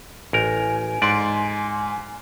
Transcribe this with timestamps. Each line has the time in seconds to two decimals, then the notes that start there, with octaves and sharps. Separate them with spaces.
0.33 A1 A#4 G#5
1.02 G#2 D5 C6